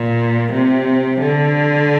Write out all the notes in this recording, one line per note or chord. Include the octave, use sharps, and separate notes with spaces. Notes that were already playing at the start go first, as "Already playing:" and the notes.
Already playing: A#2
C3
D3